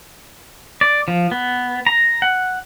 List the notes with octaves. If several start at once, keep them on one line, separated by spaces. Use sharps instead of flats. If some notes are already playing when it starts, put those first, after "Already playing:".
D5
F3
B3
A#5
F#5